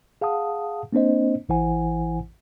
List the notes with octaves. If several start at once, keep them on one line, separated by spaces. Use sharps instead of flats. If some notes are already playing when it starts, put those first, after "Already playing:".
G#4 F5 F#5 A5 D#6
A#3 C4 D4 C5 D#5
A1 E3 E4 C5 F#5 G#5